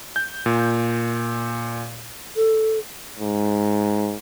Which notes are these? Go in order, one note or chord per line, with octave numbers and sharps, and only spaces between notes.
G6
A#2
A4
G#2